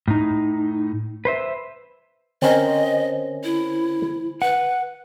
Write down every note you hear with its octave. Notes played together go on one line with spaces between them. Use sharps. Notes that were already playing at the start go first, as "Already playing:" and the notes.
A2 D#4
B4 C5 E5
D3 C4 C#4 A#4 C5 D#5 G#5
E4
B4 F#5